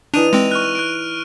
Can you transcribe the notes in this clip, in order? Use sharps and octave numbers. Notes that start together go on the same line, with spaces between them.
E3 D4 D#4 D5 D#7 F7
G#3 C4
C#6 F6 F#6
F#6 D7